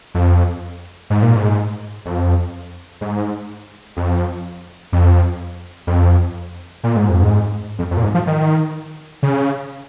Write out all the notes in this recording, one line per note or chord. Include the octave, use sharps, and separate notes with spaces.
F2
G#2
A#2
G#2
F2
G#2
F2
F2
F2
A#2
G#2
F2
G#2
F2
F2
A#2
G#2
F3
D#3
C#3